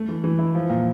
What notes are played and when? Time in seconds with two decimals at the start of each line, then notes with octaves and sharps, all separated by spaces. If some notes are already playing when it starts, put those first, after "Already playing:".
Already playing: A3
0.09 E3
0.24 E3
0.39 E4
0.55 F3
0.70 A#2